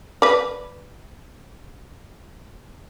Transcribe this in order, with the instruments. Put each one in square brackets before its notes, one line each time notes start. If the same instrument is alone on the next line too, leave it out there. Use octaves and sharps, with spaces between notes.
[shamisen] B4 D5